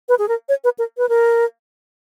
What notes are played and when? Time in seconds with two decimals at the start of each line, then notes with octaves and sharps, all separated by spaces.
0.09 B4
0.19 G#4
0.28 A#4
0.49 C#5
0.64 B4
0.79 A#4
0.98 B4
1.09 A#4